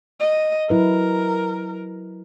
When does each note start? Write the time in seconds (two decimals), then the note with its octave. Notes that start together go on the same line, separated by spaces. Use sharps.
0.20 D#5
0.70 F#3 E4 A#4 B4